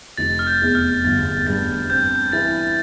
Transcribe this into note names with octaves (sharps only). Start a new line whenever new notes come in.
F1 A6
F6
G6
E2
F6
G1 A6
G2 A6
C4 G6
E3 A6